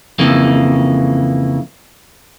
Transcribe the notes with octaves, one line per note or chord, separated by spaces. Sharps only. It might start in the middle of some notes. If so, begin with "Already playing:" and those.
F2 C#3 E3 A#3